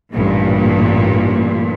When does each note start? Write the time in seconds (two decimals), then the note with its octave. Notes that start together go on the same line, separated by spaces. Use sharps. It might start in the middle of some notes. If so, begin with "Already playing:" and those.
0.13 A1 G2 A#2